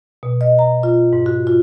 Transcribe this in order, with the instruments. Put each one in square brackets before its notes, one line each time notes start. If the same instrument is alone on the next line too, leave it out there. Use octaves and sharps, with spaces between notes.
[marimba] B2
D#5
A#5
F4
G#2
F#4
F4